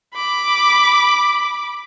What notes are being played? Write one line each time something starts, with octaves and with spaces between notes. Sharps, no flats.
B5 D6